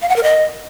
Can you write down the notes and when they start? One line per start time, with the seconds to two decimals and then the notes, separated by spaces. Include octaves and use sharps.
0.02 F5
0.09 F#5
0.16 A#4
0.23 D#5